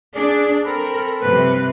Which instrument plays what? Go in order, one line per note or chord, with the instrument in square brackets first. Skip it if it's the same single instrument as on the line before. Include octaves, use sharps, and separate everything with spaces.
[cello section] D4 [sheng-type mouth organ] G#4 D5 D6
[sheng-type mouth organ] C4 A4 B5 [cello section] A#4
[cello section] G2 C3 F3 [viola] B4